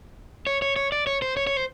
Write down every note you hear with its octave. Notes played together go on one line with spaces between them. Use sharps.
C#5
C#5
C#5
D5
C#5
C5
C#5
C#5
C5